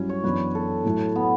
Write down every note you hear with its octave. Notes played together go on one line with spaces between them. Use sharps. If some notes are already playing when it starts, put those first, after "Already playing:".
Already playing: G2 F#3 C#4 E4
C#5
F#2 E3 B3 D4 B4
A4
A2 F#3 A3 E4
B3